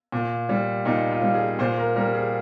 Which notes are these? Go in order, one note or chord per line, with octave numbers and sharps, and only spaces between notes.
A#2
G3
A#2 D#4
F4
G3
G#4
A#2 C5
A#4
G3 A#4
G#4